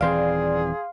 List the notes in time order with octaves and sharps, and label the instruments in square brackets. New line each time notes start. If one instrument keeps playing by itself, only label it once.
[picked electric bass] D#1 E3 C4 [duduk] G#4 [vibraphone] D5 [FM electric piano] F5 C6